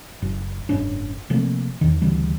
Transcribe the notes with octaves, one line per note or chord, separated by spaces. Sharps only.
F#1
F#1 G#2 C#4 D4
C3 F3 A3 A#3
E2 D#3
D2 C#3 E3 G3